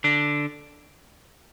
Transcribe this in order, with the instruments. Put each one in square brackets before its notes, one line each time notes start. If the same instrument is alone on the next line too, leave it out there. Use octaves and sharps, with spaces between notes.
[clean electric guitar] D3 D4